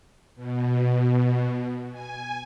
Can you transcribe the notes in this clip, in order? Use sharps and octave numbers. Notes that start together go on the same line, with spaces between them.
B2
G#5